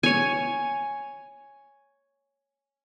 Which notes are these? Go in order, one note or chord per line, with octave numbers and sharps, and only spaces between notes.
C#5 G#5